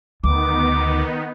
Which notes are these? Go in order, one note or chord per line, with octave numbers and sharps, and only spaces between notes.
D2 D#3 B3 D#4 D6